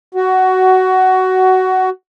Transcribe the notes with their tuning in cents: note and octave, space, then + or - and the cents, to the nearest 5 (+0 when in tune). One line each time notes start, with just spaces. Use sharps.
F#4 +15